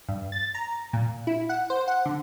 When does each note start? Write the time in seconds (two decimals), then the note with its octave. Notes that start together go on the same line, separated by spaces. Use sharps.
0.08 G2
0.32 A6
0.55 A#5
0.93 A#2
1.27 E4
1.49 F#5
1.70 C5
1.88 F#5
2.05 D3